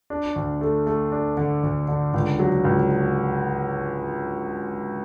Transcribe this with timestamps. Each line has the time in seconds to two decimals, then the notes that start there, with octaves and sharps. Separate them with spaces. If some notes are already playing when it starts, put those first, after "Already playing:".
0.10 D4
0.36 D2
0.61 A3
0.87 A3
1.12 D4
1.37 D3
1.63 D2
1.88 D3
2.14 C#2
2.39 F#3
2.64 C#2